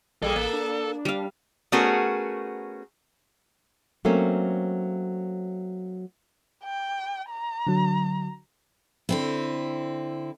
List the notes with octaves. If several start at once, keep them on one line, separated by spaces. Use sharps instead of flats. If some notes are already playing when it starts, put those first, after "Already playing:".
A#1 G3 A#3 G#4 A4
A1 A#3
D4
G3 F5
A3 B3 C#4 F#4 G#4 A#4
F#3 A3 A#3 C4 C#4
G5
A#5
D3 F#3
D3 C4 E4